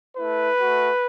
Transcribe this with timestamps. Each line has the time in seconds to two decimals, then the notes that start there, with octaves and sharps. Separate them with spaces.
0.18 A3 E4 B4
0.58 A3 F#4